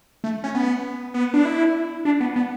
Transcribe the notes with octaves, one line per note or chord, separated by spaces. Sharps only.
A3
C#4
B3
B3
D4
E4
D4
B3
B3